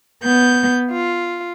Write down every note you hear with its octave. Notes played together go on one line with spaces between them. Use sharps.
B3 G6
F4